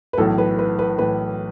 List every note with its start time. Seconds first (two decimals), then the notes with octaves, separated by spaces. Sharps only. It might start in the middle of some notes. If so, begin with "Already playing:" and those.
0.13 B4
0.18 B1 A2 E3 A4
0.38 B4
0.59 B4
0.79 B4
0.98 A2 E3 B4